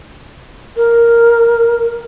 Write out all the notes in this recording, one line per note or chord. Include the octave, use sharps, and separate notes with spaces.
A#4